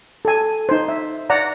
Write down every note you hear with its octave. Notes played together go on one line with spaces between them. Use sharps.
A4 G#5
D#4 C5
E5
D5 F#5 A#5